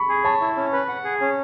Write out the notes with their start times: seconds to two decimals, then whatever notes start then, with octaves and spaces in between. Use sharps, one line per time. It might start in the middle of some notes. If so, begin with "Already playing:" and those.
Already playing: B5 C#6
0.09 G#4
0.24 C#5 A5
0.41 E4
0.57 C#4
0.72 B4
0.88 F#5
1.04 G#4
1.21 C#4